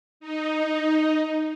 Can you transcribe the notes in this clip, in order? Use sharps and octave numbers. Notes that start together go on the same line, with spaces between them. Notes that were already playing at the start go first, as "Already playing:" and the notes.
D#4